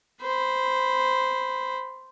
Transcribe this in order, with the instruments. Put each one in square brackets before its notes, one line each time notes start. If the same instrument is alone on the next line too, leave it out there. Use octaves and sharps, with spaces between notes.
[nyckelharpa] C5 B5